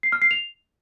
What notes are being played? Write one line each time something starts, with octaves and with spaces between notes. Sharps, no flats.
C7
F6
C7
F7